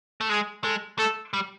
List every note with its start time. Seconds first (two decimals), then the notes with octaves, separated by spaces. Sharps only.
0.21 A3
0.29 G#3 G#4
0.63 G#3 A4
0.99 A3 A4
1.33 G3